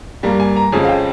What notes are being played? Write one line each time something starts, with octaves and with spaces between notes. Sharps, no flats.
G2 G3 A#3 A#5
G#5
A#5
F2 C#3 F3 G#3 G#5
F5
G5